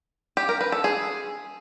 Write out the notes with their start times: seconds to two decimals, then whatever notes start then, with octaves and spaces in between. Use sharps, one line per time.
0.37 G4
0.49 A#4
0.61 B4
0.72 A4
0.84 G#4